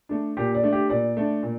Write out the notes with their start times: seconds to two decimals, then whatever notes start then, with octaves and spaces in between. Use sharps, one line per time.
0.09 A3 D4
0.37 A#2 G4
0.55 D5
0.63 A3 D4
0.72 G4
0.90 A#2 D5
1.17 A3 D4
1.43 A#2